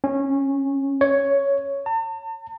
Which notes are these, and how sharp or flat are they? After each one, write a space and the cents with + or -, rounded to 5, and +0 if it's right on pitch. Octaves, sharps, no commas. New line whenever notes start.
C#4 -15
C#5 +5
A5 +45